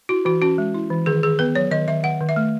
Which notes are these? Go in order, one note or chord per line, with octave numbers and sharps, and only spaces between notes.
E4 F#4
E3 F#4
C#4 F#4
G#3
E4
E3
D#3 G#4
D#3 G#4
B3 B4
F#3 C#5
D#3 D#5
D#3 E5
D#3 F#5
D#3
E5
A3